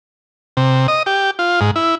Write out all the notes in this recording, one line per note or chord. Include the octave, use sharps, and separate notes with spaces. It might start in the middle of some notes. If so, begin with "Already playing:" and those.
C3
D#5
G4
F4
G#2
E4